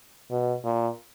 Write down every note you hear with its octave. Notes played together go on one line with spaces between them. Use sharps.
B2
A#2